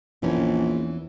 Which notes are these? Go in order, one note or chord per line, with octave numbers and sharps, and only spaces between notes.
A#1 E2 E3 C#4